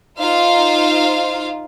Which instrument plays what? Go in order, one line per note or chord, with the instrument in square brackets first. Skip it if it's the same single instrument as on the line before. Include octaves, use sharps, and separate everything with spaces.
[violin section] D#4 F4 C5 F5